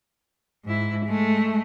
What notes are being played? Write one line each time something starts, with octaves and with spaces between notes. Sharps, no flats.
G#2 E4
G#3 A3